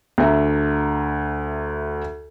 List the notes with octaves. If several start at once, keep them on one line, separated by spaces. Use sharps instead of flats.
D2 E5 A#5